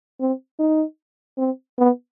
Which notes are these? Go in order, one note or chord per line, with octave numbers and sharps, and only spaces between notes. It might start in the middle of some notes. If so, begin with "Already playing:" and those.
C4
D#4
C4
B3